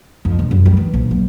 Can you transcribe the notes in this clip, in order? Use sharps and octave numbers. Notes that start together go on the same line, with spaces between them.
F2
E1
F#2
G3
E3
A#1
F#3